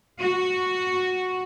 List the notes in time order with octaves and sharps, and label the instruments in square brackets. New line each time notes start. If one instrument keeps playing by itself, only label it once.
[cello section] F#4